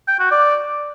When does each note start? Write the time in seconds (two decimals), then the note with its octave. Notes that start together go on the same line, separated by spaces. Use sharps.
0.08 G5
0.20 F#4
0.32 D5